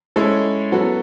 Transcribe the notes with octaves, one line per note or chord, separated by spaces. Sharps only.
G#3 C#4 E4 A4 C#5
F#3 B3 F#4 A4